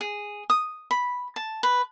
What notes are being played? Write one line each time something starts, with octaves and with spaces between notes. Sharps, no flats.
G#4
D#6
B5
A5
B4